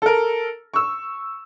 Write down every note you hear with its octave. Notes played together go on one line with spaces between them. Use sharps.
A4 A#4
C#6 E6